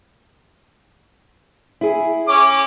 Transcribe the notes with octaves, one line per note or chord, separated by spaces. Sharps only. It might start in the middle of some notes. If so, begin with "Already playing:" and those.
E4 G#4
C#4 D6